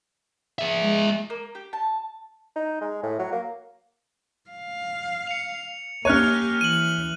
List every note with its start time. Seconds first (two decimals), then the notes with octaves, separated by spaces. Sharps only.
0.59 G#4 E5
0.82 G#3
1.30 A#3
1.55 G4
1.73 A5
2.56 D#4
2.81 G#3
3.03 A2
3.19 F#3
3.32 A#3
4.50 F5
5.27 C#7 F7
6.05 A#3 C#4 G4 C#5 F6 F#6 D#7
6.61 E3 D#7 F#7